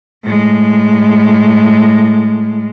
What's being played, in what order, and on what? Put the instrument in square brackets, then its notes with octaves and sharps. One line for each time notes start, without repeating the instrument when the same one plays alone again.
[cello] A2 G#3